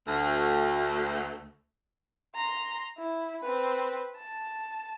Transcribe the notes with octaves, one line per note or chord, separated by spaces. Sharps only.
D2 A3
A#5 C6
E4
C4 B4
A5